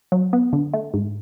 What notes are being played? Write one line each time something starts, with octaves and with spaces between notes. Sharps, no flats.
F#3
B3
D3
A3
G#2